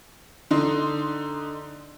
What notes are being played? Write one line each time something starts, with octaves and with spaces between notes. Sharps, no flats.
D3 D#4 C6